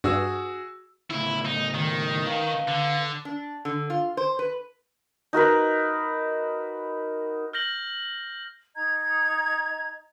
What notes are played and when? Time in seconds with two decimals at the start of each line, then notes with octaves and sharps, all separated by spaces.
0.04 G2 F#4 G#4 E6
1.10 C#2 A2 E4
1.45 D#4
1.75 D#3
2.26 B4 F5
2.68 D3
3.25 D4
3.65 D3
3.90 F4
4.17 C5
4.39 B4
5.33 D#4 F#4 A#4 B4
7.53 F6 G6 A#6 F#7 G7
8.76 D#4 D#5 A#5 G#6